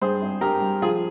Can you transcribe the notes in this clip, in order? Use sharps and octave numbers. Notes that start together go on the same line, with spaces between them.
G2 G#4 C5
G#1
G2 G4 A#4
G2
F3 F4 G#4